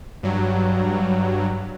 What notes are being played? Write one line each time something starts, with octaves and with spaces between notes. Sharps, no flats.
G2 F#3